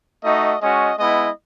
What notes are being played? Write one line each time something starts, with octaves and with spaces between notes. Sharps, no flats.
A3 D#4 F#4 D#5
G#3 C#4 F#4 D#5
G#3 B3 E4 D#5